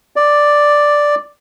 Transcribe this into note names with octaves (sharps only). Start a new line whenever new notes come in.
D5